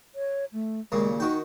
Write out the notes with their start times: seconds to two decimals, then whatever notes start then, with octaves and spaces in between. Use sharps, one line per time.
0.15 C#5
0.53 A3
0.92 D#2 A#2 C#3 G#3
1.20 D#3 D#4 F#4 G5